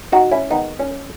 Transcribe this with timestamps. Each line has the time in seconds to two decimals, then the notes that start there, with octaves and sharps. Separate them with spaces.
0.12 D#4 F#4
0.31 C#4 E4
0.50 D#3 G#3 B3 D#4
0.79 C#4